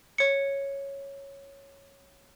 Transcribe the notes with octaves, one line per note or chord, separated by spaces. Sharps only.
C#5 C#7